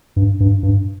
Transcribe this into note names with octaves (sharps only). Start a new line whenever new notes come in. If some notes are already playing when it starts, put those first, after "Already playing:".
G2
G2
G2